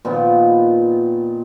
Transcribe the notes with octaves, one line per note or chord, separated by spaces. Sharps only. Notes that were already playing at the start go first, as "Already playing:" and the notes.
A#2 D#3 F3 B3